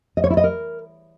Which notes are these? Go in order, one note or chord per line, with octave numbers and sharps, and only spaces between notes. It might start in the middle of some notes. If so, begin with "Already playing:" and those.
D#5
C#5
E4
D#5
A#4